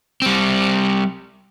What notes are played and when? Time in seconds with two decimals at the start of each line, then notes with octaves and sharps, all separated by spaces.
0.22 G3 C4